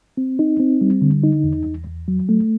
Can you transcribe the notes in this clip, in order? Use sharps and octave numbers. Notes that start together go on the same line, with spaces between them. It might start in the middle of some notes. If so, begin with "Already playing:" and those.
C4
D#4
C4
G3
D3
D#4
E2
E2
E2
F#3
A3